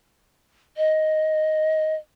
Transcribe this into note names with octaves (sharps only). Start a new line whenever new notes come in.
D#5